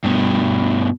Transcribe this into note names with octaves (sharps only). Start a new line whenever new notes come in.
G2 B2